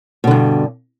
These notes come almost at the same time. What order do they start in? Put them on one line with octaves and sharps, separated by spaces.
B2 D3 G2